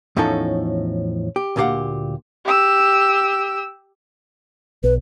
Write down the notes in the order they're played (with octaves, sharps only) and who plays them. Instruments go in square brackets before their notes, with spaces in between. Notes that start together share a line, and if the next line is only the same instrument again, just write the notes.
[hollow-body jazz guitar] E2 A2 F3 C#4 D#4 A4
G4
D2 A#2 C#4 G4 F5 F#5
[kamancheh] G4 E6
[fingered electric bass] B1 [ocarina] B4